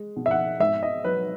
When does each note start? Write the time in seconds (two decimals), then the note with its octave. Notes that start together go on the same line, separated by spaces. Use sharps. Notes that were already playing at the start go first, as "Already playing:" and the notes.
Already playing: G#3
0.16 B2
0.26 E5
0.31 F#5
0.60 G#2 E5
0.83 D#5
1.05 F#3 B4